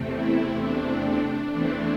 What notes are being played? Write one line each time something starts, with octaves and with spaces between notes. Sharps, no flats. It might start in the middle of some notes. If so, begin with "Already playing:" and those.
Already playing: E2 C3 A3 C4
E4
D4
D4
E2 E3 A3 C4 D4